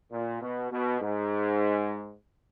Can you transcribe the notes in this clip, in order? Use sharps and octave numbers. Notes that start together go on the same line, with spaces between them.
A#2
B2
B2
G#2